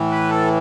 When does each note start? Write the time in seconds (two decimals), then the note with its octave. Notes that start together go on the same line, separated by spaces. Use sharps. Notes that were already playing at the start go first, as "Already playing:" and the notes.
Already playing: A2 E3
0.11 B4
0.30 A4